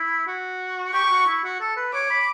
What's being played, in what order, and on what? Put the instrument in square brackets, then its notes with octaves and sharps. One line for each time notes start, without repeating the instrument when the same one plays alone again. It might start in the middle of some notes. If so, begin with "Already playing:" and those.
Already playing: [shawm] E4
F#4
[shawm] G4 [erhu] C#6
[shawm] G4
F#4
E4
F#4
A4
B4
[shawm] C#5 [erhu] D6
[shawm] B5